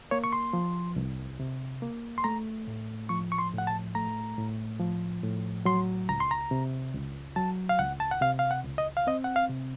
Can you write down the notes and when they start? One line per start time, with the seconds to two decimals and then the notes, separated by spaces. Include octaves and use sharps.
0.11 A#3 C#5
0.24 C#6
0.33 C6
0.53 F3
0.96 C2
1.40 C3
1.82 A#3
2.18 C6
2.24 A3 A#5
2.67 A2
3.09 F3 C#6
3.32 C#6
3.38 C6
3.53 A2
3.58 F#5
3.67 A5
3.95 A3 A#5
4.38 A2
4.80 F3
5.23 A2
5.65 F#3 C6
6.09 C#2 A#5
6.20 C6
6.31 A#5
6.51 C3
6.94 C#2
7.36 F#3 A5
7.69 F5
7.79 C#2 F#5
8.00 A5
8.11 F#5
8.21 C3 F5
8.39 F5
8.51 F#5
8.64 C#2
8.78 D#5
8.97 F5
9.07 C4 D#5
9.24 F#5
9.36 F5
9.50 C3